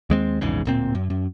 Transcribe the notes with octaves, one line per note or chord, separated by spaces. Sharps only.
D#2 G#3 C4
A#1 E2 G#2 C#3
D1 A#2 C4
F#2
F#2